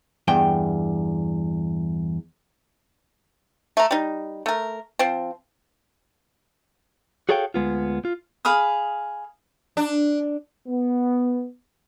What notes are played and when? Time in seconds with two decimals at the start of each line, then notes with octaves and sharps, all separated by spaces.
0.28 E2 G2 G5
3.77 A3 A#5
3.91 G3 D#4
4.46 A3 A#4
4.99 F3 C4
7.29 F#4 G#4 A4 C#5 F5 G5
7.54 D2 G#3 B3 F4
8.05 F4
8.45 G#4 F5 B5 D#6
9.77 D4
10.68 B3